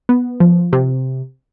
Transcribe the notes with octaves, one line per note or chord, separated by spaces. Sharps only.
B3
F3
C3